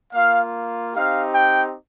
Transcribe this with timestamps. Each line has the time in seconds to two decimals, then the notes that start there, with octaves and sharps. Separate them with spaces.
0.13 A#3 F4 F5
0.94 C4 D#4 G4 F5
1.34 G5